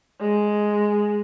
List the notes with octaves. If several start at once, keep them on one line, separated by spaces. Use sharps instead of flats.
G#3